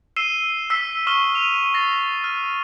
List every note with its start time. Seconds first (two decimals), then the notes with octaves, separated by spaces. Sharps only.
0.16 E6 C7 D#7 E7 G7
0.70 E6 B6 C7 G7
1.07 C#6 D#6 F6 E7 G7
1.35 D#7 F7
1.74 A6 A#6 C7
2.24 F6